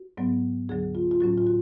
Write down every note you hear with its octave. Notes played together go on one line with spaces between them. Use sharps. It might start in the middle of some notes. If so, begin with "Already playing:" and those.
Already playing: F#4
G#2 F#3 B3
D2 D3 F#3 G#4
F4
F4
A2 F#3 C#4 F#4
F4
F#4